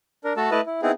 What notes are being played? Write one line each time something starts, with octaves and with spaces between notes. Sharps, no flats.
D4 A#4
A3 F#4 A4 A5
A3 E4 B4 D#5 A5
E4
B3 C4 D#4 E4 G#4